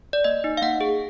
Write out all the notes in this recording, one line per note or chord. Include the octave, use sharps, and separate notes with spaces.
D5
A#3 D#5
D#4
F5
A#3 F#5
G#4